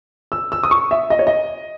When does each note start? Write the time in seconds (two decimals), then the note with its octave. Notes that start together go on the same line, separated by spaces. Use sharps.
0.32 E6
0.52 E6
0.63 D#6
0.71 C#6
0.91 E5
1.10 D#5
1.19 C#5
1.27 D#5